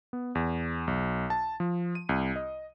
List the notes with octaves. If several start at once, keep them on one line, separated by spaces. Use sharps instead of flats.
B3
E2
B1
A5
F3
D#7
C2
D#5